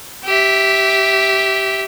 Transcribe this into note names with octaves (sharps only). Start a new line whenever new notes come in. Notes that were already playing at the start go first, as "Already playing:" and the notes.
G4 E5